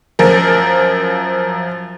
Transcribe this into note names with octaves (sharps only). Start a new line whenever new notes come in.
F#2 F3 A#4